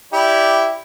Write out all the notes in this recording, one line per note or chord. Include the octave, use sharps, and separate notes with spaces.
E4 G4 D5